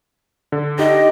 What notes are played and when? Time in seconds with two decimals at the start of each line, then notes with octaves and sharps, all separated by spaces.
0.52 D3
0.79 D#4 G4 D#5